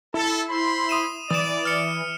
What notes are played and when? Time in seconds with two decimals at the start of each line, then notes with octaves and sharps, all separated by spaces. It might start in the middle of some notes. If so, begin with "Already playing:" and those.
0.14 E4 A4
0.49 C5 B5 C6
0.89 D#6 D#7 E7
1.30 E3 D5 D#6 E7
1.65 F6 C#7